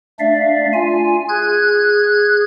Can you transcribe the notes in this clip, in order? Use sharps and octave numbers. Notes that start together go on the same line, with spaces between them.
A3 D4 D5 E5 F5
F4 G#5
G#4 F#6 G#6